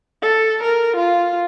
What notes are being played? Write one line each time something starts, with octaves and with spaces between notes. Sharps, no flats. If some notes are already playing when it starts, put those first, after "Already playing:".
A4
A#4
F4